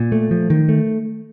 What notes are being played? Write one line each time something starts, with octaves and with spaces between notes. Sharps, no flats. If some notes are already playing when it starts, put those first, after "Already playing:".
Already playing: A#2
A3
F3
D#3
A3